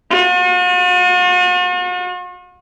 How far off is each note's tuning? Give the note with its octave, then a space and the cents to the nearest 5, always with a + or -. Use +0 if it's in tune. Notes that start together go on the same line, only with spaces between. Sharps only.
F#4 -45